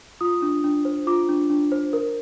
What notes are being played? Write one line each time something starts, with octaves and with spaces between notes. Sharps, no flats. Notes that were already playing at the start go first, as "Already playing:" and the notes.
F4 D#6
D4
D4
C5
F4 D6
D4
D4
C5
A#4